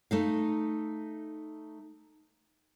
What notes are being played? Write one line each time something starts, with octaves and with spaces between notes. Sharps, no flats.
A3 D#4 F5